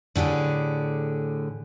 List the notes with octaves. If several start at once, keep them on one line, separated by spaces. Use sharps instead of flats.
A2 D3 G4 G#4